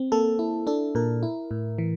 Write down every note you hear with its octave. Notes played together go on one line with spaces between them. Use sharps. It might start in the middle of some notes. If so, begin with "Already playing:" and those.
Already playing: C4
A#3 A4
E4
D4 A4
A#2 A#4
E4
A2
E3